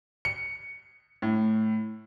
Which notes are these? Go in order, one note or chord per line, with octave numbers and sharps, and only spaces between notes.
C#7
A2